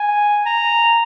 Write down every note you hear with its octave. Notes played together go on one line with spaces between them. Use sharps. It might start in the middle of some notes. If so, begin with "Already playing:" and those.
Already playing: G#5
A#5